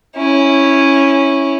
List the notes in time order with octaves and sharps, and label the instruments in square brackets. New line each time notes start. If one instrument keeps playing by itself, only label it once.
[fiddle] C#4 E4